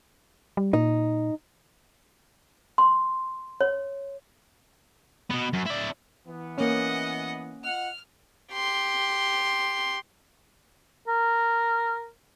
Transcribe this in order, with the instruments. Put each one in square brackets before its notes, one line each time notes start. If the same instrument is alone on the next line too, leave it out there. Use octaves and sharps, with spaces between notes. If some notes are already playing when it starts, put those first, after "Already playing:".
[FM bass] G3
[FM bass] A#2 [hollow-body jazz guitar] D#4
[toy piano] C6
C#5
[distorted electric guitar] B2 B3
F#2
E4 D5
[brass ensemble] E3 B3
[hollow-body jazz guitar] A#3 C#4 [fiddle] D#5 F#5
[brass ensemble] F4 D#5 F#5 [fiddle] F6
[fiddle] G4 C6
[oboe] A#4